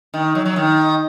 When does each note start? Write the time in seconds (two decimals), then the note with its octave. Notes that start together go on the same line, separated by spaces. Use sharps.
0.14 D#3
0.35 F#3
0.45 F#3
0.56 D#3